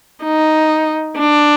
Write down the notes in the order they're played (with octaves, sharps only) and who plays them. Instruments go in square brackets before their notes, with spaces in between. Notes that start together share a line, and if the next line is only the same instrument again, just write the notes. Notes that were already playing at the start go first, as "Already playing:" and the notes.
[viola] D#4
D4